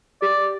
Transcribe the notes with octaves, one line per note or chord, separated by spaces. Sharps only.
G4 D5